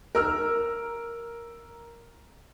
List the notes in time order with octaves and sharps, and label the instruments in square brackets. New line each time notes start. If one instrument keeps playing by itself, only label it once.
[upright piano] A#4 E6 F6